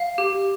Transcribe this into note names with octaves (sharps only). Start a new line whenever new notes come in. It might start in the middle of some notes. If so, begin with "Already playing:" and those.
Already playing: F5
G4